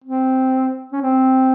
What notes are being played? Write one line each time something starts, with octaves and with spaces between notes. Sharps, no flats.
C4
C#4
C4